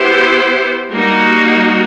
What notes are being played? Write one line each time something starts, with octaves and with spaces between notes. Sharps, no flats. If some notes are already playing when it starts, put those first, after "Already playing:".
Already playing: B3 E4 G4 C5
G3 A#3 D#4 F#4